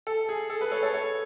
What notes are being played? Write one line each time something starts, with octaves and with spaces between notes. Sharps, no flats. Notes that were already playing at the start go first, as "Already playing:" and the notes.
A4
G#4
A4
G#4 B4
A4 C#5
A4 C#5
A4 C#5